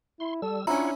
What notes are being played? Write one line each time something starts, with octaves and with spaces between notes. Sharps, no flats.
E4 C6
G3 A4 E6
C#4 D4 E4 F4 C#5 F#5 A#5